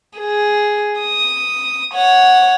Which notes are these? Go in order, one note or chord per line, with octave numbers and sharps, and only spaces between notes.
G#4
D#6
C#5 F#5